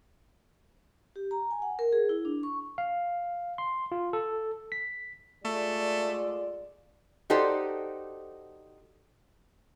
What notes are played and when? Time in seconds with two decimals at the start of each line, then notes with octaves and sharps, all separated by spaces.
1.16 G4
1.31 A#5
1.51 G#5
1.62 F#5
1.79 A#4
1.93 G#4
2.09 E4
2.25 D4
2.43 C#6
2.78 F5
3.58 C6
3.92 F4
4.13 A4
4.72 B6
5.45 G#3 A3 F4 D5
7.30 D#4 F#4 G4 A4 C5 D5